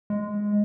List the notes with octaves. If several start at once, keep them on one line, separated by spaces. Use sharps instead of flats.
G#3